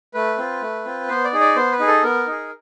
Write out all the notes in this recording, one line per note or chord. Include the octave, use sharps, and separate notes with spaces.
A3 B4
C4 F4
A3
C4 F4
B3 C5
D5
D#4 G#4
D5
B3 C5
B4
D#4 G#4
A4
B3 A#4
D#4 G#4